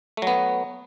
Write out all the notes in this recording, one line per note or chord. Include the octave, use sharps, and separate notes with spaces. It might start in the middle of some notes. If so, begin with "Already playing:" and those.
F#3 A3 B3